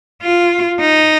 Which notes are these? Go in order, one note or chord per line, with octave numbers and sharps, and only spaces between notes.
F4
D#4